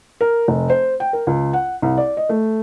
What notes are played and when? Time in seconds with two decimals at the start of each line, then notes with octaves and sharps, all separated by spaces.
0.21 A#4
0.48 F1
0.70 C5
1.00 G5
1.13 A#4
1.27 C#2
1.53 F#5
1.82 C2
1.97 D5
2.17 D#5
2.29 A3